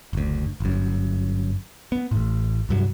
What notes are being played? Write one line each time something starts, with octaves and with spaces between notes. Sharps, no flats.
F#1 D2
G1 F#2
B3
A1 A2
C2 G2 F#3